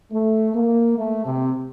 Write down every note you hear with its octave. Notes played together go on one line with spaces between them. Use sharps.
A3
A#3
A3
C3